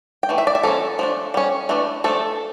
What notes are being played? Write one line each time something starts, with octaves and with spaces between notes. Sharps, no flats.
G5
E3 A3
E5
D5
E5
F3 A#3 C#4 A4
F3 A3 D4
G3 C#4
E3 A3 D4
F3 A3 D4 A4